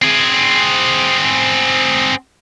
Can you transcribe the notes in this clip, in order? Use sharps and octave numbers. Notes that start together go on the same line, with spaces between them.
C4 G#4